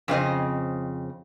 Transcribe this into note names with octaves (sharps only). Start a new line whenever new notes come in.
F2 C#3 C4 D#5